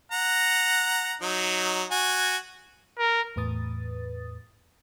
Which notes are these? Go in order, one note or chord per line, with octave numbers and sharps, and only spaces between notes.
F#5 A#5
F#3 D#4
F#4 G#5
A#4
E2 A2 B4 D#6 A6